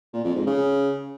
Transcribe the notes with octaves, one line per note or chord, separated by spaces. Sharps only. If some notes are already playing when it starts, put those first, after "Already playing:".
A#2
F2
G#2
C#3